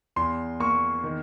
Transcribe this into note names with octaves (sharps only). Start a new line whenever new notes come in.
E2 C6
A#3 C#6
D#3